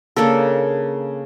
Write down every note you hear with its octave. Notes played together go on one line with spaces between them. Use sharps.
C#3 A#3 D4 A4